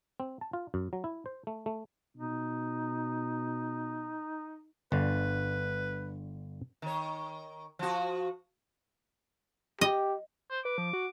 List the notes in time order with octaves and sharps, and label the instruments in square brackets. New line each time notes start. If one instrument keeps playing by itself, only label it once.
[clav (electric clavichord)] C4
A5
F4
F#2
F#3
E4
C5
A3
A3
[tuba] B2 [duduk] D#4
[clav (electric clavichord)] G1 D3 [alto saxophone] B4
[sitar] D#3 C#5
F3 F#4
[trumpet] G4 [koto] D#5
[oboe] C5
[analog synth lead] B4 [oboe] D6
[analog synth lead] F3
F#4